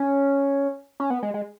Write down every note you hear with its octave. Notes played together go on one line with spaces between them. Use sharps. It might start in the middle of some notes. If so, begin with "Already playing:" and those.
Already playing: C#4
C#4
B3
G#3
G#3